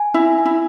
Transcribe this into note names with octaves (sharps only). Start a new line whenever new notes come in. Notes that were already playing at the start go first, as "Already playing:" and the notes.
Already playing: G#5
E4 E5
G#5
E4